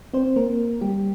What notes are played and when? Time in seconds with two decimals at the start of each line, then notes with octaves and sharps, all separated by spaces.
0.14 C4 C5
0.36 A#3 A#4
0.81 G3 G4